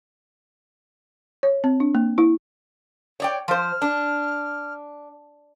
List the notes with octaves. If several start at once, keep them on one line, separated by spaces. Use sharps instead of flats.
C#5
C4
D4
A#3
E4
C#5 D5 G5
F3 C5 F6
D4